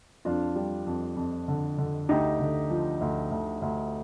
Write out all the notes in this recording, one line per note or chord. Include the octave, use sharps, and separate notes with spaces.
F2 D4 F4
G3
F2
F2
D3
D3
D2 D#4 G4
D3
F3
D2
D2
D2